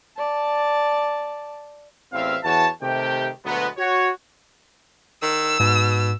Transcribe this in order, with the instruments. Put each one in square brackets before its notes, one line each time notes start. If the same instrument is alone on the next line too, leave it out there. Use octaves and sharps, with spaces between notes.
[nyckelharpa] D5 A5
[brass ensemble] A1 E2 C4 E5 F5
E2 E3 F#4 C#5 A5
C3 D#3 A3 G4 G5
D2 B2 F#3 G#3 B3
F#4 C#5
[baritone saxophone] D#3 [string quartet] E6
[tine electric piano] G#2 [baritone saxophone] B2